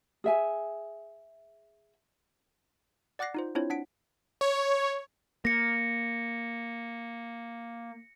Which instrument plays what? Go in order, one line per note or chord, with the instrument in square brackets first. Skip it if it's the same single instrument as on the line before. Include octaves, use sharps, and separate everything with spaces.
[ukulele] G#4 E5 G#5
[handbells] D5 F#5 D6 F#6 A#6 C7
D#4 F4 C5
C4 D4 E4 F4 C5 C#5
D4 F#5 B6 D7
[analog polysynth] C#5
[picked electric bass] A#3 [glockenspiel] A#6 C#7